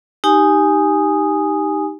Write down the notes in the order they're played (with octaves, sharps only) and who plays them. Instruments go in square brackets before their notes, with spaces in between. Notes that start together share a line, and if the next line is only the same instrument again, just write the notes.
[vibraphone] D#4 G4 G#5 D#6